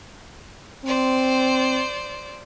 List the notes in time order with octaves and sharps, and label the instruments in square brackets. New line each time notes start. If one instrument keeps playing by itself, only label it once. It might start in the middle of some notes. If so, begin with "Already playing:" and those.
[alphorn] C4 [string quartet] C5 D5